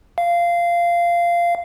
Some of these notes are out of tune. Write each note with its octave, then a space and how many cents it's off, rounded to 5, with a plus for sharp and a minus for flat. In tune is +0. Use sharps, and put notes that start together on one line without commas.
F5 -15